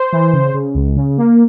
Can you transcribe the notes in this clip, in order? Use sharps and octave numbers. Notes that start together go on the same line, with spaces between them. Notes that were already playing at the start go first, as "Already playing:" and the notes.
Already playing: C5
E3
C#3
C#3
C#2
C#3
A#3